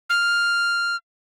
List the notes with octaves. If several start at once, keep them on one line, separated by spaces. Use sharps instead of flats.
F6